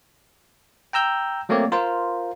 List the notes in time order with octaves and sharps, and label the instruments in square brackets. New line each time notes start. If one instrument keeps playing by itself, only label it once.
[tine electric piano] G5 A#5 E6 G6
F#3 A3 A#3 C4 C#5 D5
F4 A#4 C5 F5